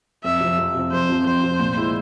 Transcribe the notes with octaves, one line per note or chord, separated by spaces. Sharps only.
F2 E5
C3 F3
F2
C3 F3
F2 C5
C3 F3
F2 C5
C3 F3
A#2
G#3 E4